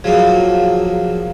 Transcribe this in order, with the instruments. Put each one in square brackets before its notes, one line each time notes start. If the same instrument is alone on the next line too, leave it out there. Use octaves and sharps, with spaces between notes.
[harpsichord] F3 F#3 A#3 [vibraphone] G#4